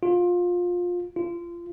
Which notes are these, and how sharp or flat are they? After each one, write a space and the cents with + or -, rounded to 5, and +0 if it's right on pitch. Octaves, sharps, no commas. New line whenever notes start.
F4 +20
F4 -25